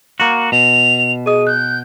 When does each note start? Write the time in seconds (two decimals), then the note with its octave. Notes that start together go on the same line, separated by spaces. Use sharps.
0.20 A#3 F#4
0.52 B2 F7
1.26 G#4 D#5 D#6 D#7
1.47 F#6 G6